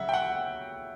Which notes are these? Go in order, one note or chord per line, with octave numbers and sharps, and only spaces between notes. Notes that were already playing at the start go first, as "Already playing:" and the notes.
Already playing: C#3 F#3 E5 F#5
G5
F#5